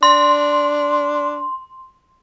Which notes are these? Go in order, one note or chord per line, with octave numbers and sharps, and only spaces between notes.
D4 C6